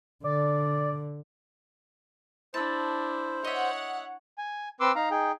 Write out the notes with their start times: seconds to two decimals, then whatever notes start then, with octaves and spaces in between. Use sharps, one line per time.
0.24 D3 D5
2.54 D4 E4 C5 A5 E6
3.44 C#5 D#5 E5 F#5
4.38 G#5
4.80 C4 B4 C6 D6 E6
4.95 D#4 F5 A#5
5.11 D#4 G#4 G5